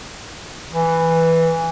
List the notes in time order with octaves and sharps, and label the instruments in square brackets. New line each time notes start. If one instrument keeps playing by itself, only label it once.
[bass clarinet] E3